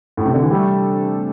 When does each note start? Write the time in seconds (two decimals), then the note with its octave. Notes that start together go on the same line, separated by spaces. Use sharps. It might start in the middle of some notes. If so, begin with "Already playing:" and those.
0.17 A2
0.25 C3
0.34 D3
0.42 E3
0.49 C3 G3 A3 D4 A4